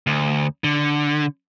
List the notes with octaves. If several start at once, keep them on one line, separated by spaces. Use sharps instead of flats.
D2
D3